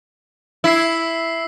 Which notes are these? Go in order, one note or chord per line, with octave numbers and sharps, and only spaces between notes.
E4 E6 B6 C7